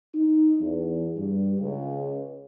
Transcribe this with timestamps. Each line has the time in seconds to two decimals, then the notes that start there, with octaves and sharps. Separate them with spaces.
0.15 D#4
0.60 E2
1.17 G2
1.59 C#2